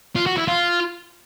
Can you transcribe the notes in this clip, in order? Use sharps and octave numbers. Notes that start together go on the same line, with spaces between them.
F4
F#4
E4
F4